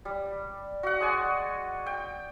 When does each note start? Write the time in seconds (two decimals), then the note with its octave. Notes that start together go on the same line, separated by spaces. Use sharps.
0.05 G3
0.83 F#4 F#5
1.00 G#3 D5 G#5
1.86 G5